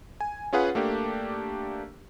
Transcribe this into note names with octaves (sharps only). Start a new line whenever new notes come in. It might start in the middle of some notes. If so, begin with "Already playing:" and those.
G#5
C#4 F4 G#4 B4 F#5
A3 A#3 D4 G4